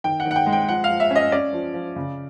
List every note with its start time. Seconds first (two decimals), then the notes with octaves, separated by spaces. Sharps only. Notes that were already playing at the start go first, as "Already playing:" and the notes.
0.04 D#3 G5
0.20 F#5
0.26 D#3
0.31 F#5
0.36 G5
0.46 G#3
0.53 G5
0.68 F3 F#5
0.84 F5
0.89 F3
1.00 E5
1.10 C#4
1.16 D#5
1.32 C#4 D5
1.53 F3
1.74 F3
1.96 C#3